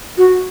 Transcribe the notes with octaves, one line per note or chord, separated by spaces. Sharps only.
F#4